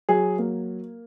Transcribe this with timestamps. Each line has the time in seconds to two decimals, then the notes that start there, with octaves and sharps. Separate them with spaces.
0.09 F#3 G#4
0.39 A#3